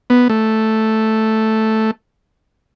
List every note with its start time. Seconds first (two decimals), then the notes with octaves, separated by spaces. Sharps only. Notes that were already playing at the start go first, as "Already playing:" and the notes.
0.10 B3
0.29 A3